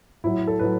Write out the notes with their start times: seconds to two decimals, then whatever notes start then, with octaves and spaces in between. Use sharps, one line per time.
0.24 A2 F#3 E4
0.47 A4
0.59 A2 F#3 B4